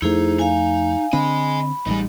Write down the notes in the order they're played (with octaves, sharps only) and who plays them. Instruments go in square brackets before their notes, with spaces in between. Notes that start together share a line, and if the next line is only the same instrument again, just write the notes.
[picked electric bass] F2 A3 [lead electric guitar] D#4 [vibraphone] E4 G#4 C5
[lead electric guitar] D#4 [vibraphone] F5 G#5
[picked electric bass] D3 C4 D4 [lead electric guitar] D#5 G#5 [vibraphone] B5
[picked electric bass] A1 G3 [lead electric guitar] G#2 D#4